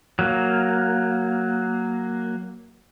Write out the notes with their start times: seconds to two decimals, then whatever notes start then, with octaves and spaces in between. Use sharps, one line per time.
0.19 F#3 A#3